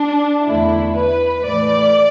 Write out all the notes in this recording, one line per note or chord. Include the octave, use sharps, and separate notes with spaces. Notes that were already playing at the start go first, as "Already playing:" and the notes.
Already playing: D4
E2 D3 A3 E4
B4
A2 E3 A3 D5